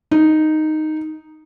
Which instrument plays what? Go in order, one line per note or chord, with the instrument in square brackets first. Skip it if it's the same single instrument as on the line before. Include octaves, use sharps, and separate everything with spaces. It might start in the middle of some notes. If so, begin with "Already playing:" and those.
[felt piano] D#4